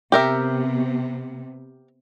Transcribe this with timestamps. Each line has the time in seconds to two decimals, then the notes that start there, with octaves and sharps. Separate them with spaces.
0.12 C3 B3 G4 A#4 E5